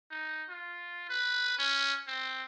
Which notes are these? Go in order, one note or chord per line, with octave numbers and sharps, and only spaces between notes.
D#4
F4
B4
C#4
C4